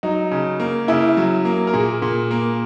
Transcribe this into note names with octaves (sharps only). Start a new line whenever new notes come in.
F#3 D#4
C#3
A#3
C#3 E4
F#3
A#3
A#4
A#2 G#4
A#2
A#3